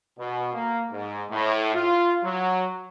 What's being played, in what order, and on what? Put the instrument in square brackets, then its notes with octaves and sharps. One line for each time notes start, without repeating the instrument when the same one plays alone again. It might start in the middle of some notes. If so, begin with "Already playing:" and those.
[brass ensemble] B2
A#3
G#2
A2
F4
F#3